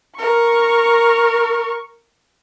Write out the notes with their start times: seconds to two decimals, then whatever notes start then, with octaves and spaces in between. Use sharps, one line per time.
0.16 A#4 C#6